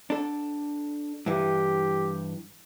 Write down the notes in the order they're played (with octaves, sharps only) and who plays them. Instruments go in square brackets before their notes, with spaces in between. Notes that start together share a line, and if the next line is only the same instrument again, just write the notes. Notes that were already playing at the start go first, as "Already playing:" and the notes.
[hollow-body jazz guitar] D4 A4
[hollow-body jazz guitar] G2 E3 [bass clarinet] G4